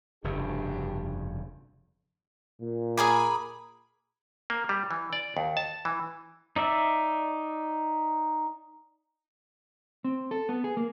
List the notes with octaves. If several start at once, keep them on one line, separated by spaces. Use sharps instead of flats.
F1 G2 C#3 D4 F#4 G4
A#2
G#4 A#4 G#5 B5 D6 D#6
A#3
G3
E3
D5
D#2
A5
E3
D#4 D5 E5
C4
A4
B3
G#4
A#3